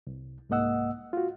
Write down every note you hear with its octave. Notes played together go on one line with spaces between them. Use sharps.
C2
C2 G#2 A#3 D#5 F#5 E6
F4 F#4